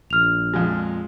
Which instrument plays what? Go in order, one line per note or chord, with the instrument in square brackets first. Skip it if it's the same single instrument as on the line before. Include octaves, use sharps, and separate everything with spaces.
[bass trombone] A#1 [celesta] F6 F7
[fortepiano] F2 A#2 G#3